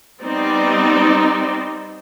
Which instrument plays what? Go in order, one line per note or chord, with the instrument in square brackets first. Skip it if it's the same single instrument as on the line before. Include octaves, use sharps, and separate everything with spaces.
[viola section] G3 B3 C4 D#4 D5